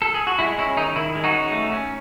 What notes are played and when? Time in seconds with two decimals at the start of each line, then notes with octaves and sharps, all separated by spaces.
0.02 A4
0.14 G#4
0.27 F#4
0.39 G#3 E4
0.59 C#4 E4
0.77 D#3 D#4
0.96 D#3 E4
1.15 G#3
1.24 D#4 F#4
1.33 C#4
1.52 A3
1.72 C#4